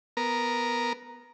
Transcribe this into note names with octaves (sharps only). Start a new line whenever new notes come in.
B3 A#4 A#5